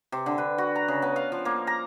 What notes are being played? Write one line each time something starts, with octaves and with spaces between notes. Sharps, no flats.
C3
D3
B4
F#4
A#5
C#3
B3
F5
F3
A#3
A#5